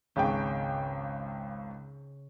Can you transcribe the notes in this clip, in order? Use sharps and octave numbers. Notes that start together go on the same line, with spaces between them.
G#1 C#2 C#3 G5